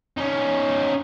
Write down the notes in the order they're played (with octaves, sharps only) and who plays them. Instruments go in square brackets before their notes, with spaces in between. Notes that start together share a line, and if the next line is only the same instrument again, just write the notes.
[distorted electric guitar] C#4 D#4